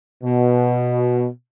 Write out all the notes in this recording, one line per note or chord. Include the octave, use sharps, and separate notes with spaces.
B2